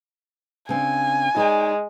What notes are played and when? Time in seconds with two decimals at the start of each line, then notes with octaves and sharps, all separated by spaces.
0.69 C#3 C4 D4 G#5
1.36 G#3 D#4 C#5 D5